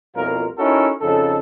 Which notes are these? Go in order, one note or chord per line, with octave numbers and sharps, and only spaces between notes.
C2 F2 B2 C#4 F4 A#4
C#4 D#4 E4 F#4 A4 A#4
F2 C#3 D#4 A4